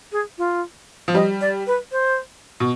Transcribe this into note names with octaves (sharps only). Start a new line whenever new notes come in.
G#4
F4
F3
G3 D#5
D5
B4
C5
B2